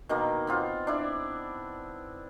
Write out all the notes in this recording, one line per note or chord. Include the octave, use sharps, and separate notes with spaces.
B2 D#3 A#3
B3 C4 F4
D4 E4 D5